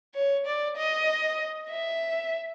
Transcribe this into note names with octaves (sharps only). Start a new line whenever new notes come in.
C#5
D5
D#5
E5